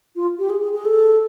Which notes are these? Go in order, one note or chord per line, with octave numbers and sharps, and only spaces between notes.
F4
G4
G#4
G#4
G#4
A4